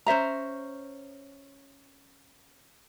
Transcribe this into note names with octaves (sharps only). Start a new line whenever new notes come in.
C#4 C5 E5 A#5